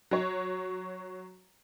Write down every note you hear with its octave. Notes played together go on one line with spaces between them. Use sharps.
F#3 C#5